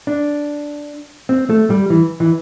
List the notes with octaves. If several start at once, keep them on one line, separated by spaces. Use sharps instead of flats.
D4
C4
A3
G3
E3
E3